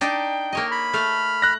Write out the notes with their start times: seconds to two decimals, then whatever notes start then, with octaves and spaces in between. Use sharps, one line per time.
0.01 D4 D#4 D5 G5
0.53 A#3 C#5 D#5
0.71 B5
0.93 A3 F6
1.42 F#6 A#6